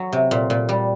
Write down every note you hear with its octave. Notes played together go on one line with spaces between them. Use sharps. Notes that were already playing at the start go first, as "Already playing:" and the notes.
Already playing: F#3
C3
A#2
A#2
G3